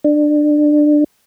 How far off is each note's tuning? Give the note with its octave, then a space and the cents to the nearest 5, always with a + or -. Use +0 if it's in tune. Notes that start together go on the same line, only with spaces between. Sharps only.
D4 +20